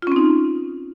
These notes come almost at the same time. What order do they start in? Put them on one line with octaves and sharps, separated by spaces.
F4 C#4 C4 D#4